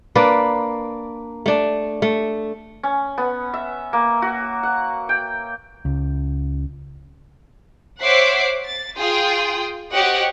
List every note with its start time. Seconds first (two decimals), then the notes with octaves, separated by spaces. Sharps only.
0.15 A#3 D4 B4 D5
1.46 A3 D4
2.02 A3
2.83 C#4
3.18 B3
3.54 E5
3.93 A#3
4.22 F#4
4.63 F#5
5.09 G5
5.85 C#2
8.00 C5 C#5 E5 F#5 D6 C7
8.65 A6
8.97 F4 G#4 G5 C6 D#6
9.92 F#4 G4 C5 C#5 D#5 F#5